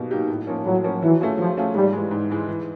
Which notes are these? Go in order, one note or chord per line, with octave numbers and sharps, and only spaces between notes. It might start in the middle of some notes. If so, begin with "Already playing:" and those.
Already playing: B2 F#3 A#3 D#4 G4
F#3 A#3 D#4 G4
A2
F3 A#3 C#4
A2 F#3
F3 A#3 C#4
E3 F#3
A3 C#4 F4 G#4
F3 F#3
A3 C#4 F4 G#4
G#2 G3
E3 G#3
G#2
E3 G#3
E3